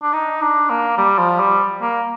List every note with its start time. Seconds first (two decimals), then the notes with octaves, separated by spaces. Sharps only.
0.03 D4
0.13 D#4
0.42 D4
0.70 A#3
0.98 G3
1.19 F3
1.40 G3
1.81 A#3